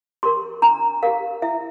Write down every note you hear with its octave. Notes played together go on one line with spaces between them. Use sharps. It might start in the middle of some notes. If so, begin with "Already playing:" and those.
G4 A#4 C6
D4 A#5
G4 A#4 F5
E4 E5